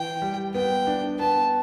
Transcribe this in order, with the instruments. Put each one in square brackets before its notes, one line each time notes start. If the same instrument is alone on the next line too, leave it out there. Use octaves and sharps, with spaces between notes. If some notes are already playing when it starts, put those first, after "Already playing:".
Already playing: [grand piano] E3 [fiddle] G5
[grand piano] G3
[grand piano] B3 [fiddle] G5
[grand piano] D4
[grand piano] B3 [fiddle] A5